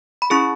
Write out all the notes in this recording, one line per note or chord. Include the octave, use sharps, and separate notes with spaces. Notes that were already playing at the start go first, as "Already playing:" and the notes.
B5
C#4 E4 G#4 C#6